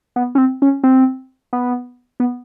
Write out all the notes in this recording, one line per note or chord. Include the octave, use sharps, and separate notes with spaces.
B3
C#4
C4
C#4
C4
B3
B3